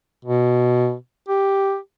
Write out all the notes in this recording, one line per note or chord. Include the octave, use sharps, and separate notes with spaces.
B2
G4